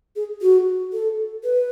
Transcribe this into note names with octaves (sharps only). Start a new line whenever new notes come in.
G#4
F#4
A4
B4